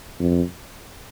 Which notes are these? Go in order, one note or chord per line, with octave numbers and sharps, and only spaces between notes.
F2